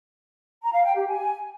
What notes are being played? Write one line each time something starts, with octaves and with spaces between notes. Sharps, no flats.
A#5
F5
G5
G4
G#5